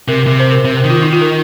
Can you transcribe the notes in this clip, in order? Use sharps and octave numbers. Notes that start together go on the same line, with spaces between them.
C3 A#4
C3 A#4
C5
A#4
C3 C5
A#4
D#3
F4
D#4
F4
A#4